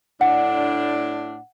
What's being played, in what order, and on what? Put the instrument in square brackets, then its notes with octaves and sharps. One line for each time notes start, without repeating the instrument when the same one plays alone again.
[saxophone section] A2 D4 [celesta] F#5